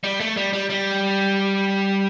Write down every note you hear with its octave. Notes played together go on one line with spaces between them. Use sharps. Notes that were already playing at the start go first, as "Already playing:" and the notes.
G3
A3
G3
G3
G3